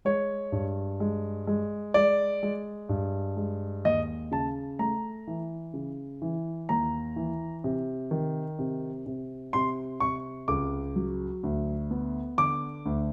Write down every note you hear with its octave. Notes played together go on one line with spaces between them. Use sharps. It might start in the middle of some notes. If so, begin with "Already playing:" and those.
G#3 C#5
G2
G#3
G#3
G#3 D5
G#3
G2
G#3
D#2 D#5
C#3 A5
A3 A#5
E3
C#3
E3
D#2 A#5
E3
C3
D#3
C3
C3
C3 C6
C3 C#6
C#2 D6
F#3
D2
B3
D3 D6
D2